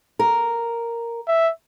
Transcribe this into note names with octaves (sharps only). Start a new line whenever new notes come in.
A#4
E5